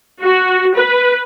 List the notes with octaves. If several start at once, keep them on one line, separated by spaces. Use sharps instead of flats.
F#4
B4